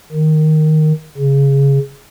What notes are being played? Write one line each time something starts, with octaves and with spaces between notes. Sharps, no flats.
D#3
C#3